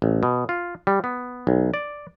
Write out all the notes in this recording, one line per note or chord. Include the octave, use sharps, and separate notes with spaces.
A1
B2
F4
G3
B3
B1
D5